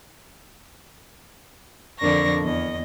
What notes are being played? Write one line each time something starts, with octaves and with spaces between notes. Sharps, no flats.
F2 D3 D4 A#4 C#6 A#6
E2 D#5